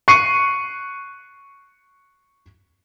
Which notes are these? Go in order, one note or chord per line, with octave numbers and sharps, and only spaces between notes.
C#6 F#6 C7 C#7 D#7